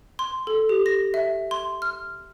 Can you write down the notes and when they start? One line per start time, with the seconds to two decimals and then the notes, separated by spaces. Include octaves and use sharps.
0.19 C6
0.47 A4
0.69 G4
0.86 A#6
1.14 E5
1.51 C6
1.82 F6